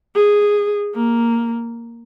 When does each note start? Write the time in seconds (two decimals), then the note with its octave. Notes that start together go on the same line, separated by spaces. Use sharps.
0.15 G#4
0.95 A#3